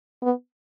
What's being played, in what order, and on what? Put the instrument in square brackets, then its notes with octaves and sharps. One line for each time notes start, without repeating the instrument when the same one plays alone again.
[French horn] B3